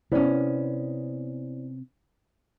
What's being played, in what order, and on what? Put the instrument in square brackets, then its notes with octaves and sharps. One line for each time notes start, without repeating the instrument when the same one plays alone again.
[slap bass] C3 [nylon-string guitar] B3 C#4 [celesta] E4 C5 D5